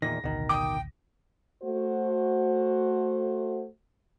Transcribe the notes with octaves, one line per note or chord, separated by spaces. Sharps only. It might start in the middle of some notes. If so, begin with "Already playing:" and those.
E2 A#2 D#3 A#6
A1 D2 B2 D#3
G5 D6 D#6
A3 F#4 C5